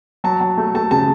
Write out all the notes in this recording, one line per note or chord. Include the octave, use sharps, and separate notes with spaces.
F#3 A5
F#3
A3
A3 A5
C#3 A5